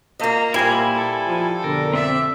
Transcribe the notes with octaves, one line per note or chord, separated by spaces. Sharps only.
A#2 A#3 D#5
A#2 G3 E4 C5 G#5
A4
F3
F2 B2 D3 A#4
C4 D5 E5